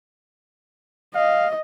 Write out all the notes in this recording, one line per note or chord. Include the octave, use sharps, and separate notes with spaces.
D#5 F5